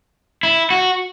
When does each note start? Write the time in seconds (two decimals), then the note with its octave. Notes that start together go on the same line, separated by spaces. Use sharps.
0.43 E4
0.70 F#4